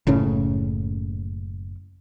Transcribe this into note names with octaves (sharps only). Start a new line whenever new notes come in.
F#1 A2 C#3 C#4